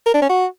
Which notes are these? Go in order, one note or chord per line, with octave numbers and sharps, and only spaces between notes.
A#4
D4
C#4
F#4